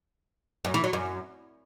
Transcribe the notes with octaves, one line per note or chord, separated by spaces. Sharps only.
F#2
E3
F#3
F#2